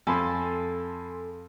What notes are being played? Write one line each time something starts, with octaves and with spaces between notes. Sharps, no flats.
F2 A4 G#5 B5 C6